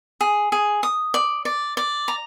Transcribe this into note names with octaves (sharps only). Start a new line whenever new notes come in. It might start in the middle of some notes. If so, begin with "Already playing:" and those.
G#4
G#4
D#6
D5
D5
D5
A#5